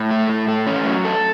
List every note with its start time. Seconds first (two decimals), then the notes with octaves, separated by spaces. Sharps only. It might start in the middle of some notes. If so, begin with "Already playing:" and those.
Already playing: A2
0.11 A3
0.30 A2
0.48 A3
0.67 C#4
0.86 F#3
1.05 A4